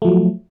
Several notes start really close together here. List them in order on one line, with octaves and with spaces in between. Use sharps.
A3 F3 F#3